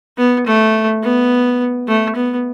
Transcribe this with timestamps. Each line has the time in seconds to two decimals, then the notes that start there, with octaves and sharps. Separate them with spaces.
0.18 B3
0.46 A3
1.03 B3
1.88 A3
2.16 B3